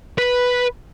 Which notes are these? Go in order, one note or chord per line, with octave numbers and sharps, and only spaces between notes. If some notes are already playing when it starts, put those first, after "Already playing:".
B4